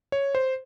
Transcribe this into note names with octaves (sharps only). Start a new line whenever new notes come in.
C#5
C5